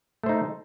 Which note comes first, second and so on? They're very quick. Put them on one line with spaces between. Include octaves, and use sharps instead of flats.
A3 C5 D#4